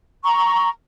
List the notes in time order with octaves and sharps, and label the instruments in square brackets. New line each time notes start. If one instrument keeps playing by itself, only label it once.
[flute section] A#5 C#6